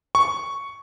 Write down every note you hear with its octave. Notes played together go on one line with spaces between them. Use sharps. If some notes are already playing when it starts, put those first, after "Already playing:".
C#6